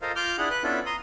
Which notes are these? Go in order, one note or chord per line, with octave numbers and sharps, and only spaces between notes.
F4 A4 A#4 C5 D#5 F5
F4 D6 F6 G6
D4 E4 G#4 F#5
B4 F#6
B3 C#4 D4 E4 F4 A4
A#5 C6 D#6